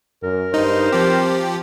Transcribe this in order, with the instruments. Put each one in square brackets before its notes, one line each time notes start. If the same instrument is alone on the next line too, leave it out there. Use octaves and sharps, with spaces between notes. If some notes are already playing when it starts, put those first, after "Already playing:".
[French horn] F#2 [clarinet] A#4
[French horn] G2 [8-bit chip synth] D#4 [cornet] C5
[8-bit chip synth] F3 G4 [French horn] C4